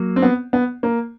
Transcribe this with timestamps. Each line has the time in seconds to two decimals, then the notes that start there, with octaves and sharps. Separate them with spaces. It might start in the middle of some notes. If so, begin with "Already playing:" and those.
Already playing: F#3 A#3
0.16 C4
0.23 B3
0.53 B3
0.83 A#3